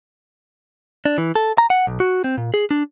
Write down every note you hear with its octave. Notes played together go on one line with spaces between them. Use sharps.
D4
E3
A4
A#5
F#5
B1
F#4
C4
A#2
G#4
D4